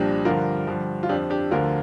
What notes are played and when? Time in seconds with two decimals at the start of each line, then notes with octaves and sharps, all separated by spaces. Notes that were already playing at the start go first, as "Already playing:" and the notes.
Already playing: C2 A#2 F3 D4 G4
0.25 G2 D3 F3 F4 A#4
0.67 G2 D3 F3
1.03 F4
1.09 F2 F3 D4 G4
1.30 D4 G4
1.51 D2 D3 F3 F4 A#4